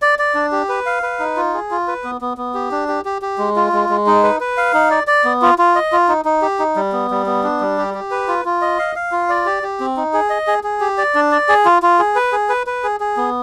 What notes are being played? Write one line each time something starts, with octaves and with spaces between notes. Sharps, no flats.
D5
D5
D4
G4
B4
F5
B4
D#4
F4
G#4
F4
B4
B3
B3
B3
G4
D4
G4
G4
G4
G#3
F4
G#3
G#3
D#4
B4
B4
F5
D#4
D5
D5
B3
F4
F4
D#5
F4
D#4
D#4
G4
D#4
G3
B3
G3
B3
D4
G3
G4
G4
B4
F4
F4
D#5
F5
F5
F4
D5
G4
G4
C4
D#4
G#4
D#5
G#4
G#4
G4
D5
D4
D5
G#4
F4
F4
G#4
B4
G#4
B4
B4
G#4
G#4
B3